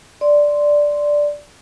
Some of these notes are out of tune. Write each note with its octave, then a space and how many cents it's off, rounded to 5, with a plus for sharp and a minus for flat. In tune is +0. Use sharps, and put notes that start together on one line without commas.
D5 +0 C6 -5